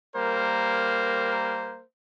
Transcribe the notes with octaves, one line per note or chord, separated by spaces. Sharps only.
G3 A#3 A#4 C5